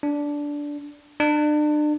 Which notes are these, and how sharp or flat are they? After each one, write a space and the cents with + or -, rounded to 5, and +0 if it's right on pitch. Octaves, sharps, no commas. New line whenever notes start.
D4 -10
D4 +35